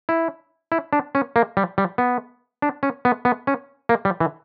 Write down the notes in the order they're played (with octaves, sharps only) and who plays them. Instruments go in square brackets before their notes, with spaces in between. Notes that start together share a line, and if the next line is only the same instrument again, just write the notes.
[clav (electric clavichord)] E4
E4
D4
C#4
A#3
G3
G3
B3
D4
C#4
B3
B3
C#4
A#3
G3
E3